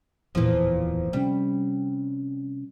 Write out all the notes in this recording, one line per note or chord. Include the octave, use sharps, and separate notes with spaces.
D1 E2 A#2 E3 F3
C3 G3 C#4